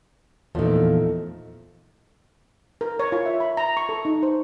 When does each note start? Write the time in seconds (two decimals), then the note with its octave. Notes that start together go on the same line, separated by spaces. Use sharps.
0.55 E2 A#2 F3 A3 D#4
2.81 A#4
2.99 C#5
3.12 F4
3.26 E5
3.40 B5
3.57 A#5
3.77 C#6
3.89 A4
4.05 D#4
4.23 C5